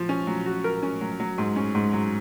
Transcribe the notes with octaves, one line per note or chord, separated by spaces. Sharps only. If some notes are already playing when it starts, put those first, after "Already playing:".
Already playing: F3
C#4
F#3
F#4
A#4
C#4
F#3
F#3
G#2
C#4
G#2
F#3